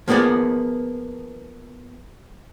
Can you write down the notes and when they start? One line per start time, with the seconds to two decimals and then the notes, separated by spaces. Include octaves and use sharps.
0.08 F3 A#3 B3 G#4 D5